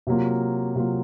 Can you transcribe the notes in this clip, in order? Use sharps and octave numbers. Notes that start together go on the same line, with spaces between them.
C3 F#3 A#3 F4
C3 F#3 A#3 F4